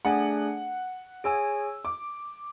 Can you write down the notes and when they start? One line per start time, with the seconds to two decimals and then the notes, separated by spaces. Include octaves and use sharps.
0.05 A3 D4 G#4 D5 F#5 G#5
1.24 G#4 C#5 G#5 E6
1.85 D6